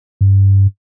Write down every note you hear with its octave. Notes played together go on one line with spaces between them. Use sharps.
G2